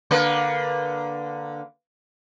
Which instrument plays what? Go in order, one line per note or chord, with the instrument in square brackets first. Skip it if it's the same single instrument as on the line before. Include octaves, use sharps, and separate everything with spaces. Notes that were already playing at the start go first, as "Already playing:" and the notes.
[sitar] D3 A#3 B4